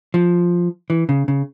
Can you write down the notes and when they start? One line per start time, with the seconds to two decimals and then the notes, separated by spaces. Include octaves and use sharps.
0.14 F3
0.90 E3
1.09 C#3
1.28 C#3